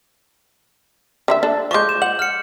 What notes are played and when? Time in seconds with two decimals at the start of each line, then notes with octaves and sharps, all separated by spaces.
1.28 D3 E4 E5
1.43 D4 A4
1.71 F3 G#3 C#6 D6 G6
1.89 E7
2.02 F#5 F#7
2.19 F6 C#7